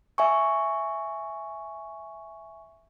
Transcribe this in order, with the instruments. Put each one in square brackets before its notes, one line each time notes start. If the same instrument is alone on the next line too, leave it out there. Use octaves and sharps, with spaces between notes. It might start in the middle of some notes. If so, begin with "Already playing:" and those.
[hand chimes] E5 G#5 C#6